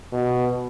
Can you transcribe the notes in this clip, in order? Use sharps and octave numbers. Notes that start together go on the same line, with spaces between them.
B2